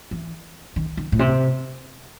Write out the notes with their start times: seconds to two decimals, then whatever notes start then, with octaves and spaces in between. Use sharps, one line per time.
0.11 E3
0.76 D#3
0.97 D#3
1.12 A2
1.19 C3